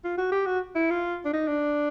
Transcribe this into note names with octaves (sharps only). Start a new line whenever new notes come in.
F4
F#4
G4
F#4
E4
F4
D4
D#4
D4